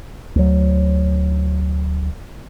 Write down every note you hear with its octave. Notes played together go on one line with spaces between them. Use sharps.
D2 F#3